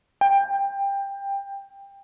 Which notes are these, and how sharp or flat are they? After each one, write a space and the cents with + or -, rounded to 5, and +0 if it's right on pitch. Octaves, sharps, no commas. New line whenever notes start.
G5 +20